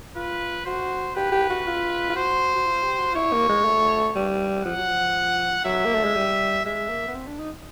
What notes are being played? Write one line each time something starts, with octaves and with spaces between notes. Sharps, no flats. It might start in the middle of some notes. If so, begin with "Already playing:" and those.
F4 B4
F#4 C5
G4 B4
G4
F#4
F4
F4
F#4 C5
F#4
F4
G4
F#4
F4
E4 C#5
A#3
G#3
A3
G3
F3 F#5
F#3
F3
F#3 E5
A#3
A3
G#3
G3
G#3 E5
A#3
B3
C4
D4
D#4